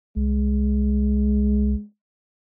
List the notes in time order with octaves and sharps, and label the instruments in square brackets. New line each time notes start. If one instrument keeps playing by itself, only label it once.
[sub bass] C2 [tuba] G#3